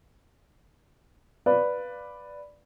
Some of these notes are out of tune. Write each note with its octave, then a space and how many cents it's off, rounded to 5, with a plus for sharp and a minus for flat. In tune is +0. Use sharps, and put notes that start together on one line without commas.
B4 +0 D5 +0 F5 +0